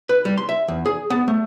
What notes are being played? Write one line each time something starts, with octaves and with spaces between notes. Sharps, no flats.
B4
G3
C6
E5
E2
G#4
B3
A3